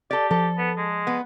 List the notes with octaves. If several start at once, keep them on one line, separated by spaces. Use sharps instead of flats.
G4 A4 D5
F3 A4
B3
G#3
B3